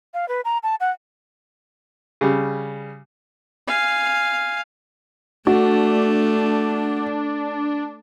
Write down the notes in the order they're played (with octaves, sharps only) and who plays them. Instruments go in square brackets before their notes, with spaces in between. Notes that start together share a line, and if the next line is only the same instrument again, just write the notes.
[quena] F5
B4
A#5
A5
F#5
[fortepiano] C#3 G3
[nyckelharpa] F5 G#5
[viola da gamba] A3 [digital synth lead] D4 [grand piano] F#4